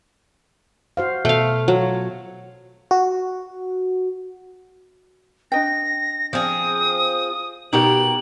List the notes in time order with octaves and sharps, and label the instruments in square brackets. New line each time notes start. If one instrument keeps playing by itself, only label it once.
[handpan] F#4 C5 F5
[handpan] B2 [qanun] A3 F5
[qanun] F#3 [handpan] F4 C#5
[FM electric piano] F#4
[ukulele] D4 D#5 G5 [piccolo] A#6
[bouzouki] F3 C4 G#4 [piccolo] D#6
[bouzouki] B2 G4 A#4 [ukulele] D#4 F#5 [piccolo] F#7